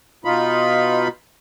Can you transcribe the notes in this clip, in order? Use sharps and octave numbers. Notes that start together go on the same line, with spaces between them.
B2 D#4 F4 B5